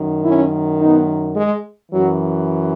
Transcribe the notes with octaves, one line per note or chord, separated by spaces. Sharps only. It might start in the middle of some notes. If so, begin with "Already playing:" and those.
Already playing: F#2 D#3
C#4 E4
B3 D#4
G#3
F#2 E3 F#3